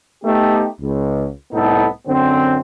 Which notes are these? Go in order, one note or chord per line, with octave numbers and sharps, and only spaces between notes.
A3 B3 D#4 G4
C#2
C2 A2 B3 D#4 A4
F#2 D3 C4